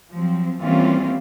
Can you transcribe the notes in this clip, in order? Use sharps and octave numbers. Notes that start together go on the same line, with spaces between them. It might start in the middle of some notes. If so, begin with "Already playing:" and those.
F3 F#3 C4
E3 G3 A#3 C4 C#4 F4